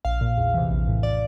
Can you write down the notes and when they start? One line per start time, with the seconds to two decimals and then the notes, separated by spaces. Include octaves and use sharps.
0.05 A#1 F5
0.21 A#2
0.38 E2
0.54 C3 E3
0.71 A#1
0.87 A2 E3
1.03 D5